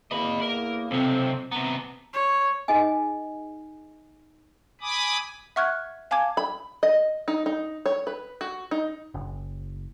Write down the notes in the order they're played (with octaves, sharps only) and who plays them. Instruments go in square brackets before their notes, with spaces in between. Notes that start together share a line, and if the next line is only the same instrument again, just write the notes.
[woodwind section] E2 A#3 [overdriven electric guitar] D#5 B5
[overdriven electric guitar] A#4
[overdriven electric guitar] B1 C3 [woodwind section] F2 F3 C4
[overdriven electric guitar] C3 B3 [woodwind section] B4 A5 A#5
[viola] C#5
[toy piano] D#4 G#4 D#5 G#5
[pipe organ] G#5 B5 D6 D#6
[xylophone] E5 F#5 C#6 F6 F#6 G#6
F5 G#5 A5 D6 G#6
[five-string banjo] B5
D#5
D#4
D#4
C#5
B4
F#4
D#4
[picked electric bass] F#1